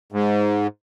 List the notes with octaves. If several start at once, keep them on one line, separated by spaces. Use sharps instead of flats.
G#2